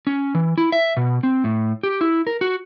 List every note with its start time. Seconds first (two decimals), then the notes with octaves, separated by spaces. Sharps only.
0.07 C#4
0.35 E3
0.58 E4
0.72 E5
0.97 B2
1.23 C4
1.44 A2
1.83 G4
2.01 E4
2.27 A#4
2.41 F#4